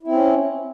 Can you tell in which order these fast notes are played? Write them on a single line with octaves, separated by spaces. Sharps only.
E4 C4 C#4